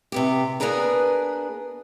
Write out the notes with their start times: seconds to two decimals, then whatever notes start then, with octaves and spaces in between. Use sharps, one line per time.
0.12 C3 B3 G4
0.60 A#3 B3 D4 G#4 A#4 B4